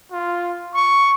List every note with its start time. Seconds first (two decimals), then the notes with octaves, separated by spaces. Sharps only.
0.12 F4
0.74 C#6